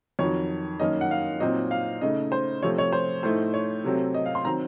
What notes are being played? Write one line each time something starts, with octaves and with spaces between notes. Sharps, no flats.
F2 D#3 F#3 C#5
F#2 D#3 A#3 C#4 D#5
F#5
F5
A#2 F#3 C4 D#4 D#5
F5
C#3 A3 D#4 D#5
C5
C3 F3 A3 C4 C#5
C#5
C5
A2 A3 D#4 C5
C#5
C3 F#3 A3 C4
D#5
F5
C6
D#3 F#3 C4 A#5